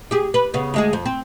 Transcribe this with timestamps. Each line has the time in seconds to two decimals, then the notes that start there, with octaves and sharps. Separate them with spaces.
0.11 G4 G#4
0.34 B4
0.54 C#3 B3
0.74 D2 G#3 G#4
0.93 F2
1.06 C4